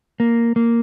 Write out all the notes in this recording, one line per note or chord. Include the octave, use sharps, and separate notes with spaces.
A#3
A#3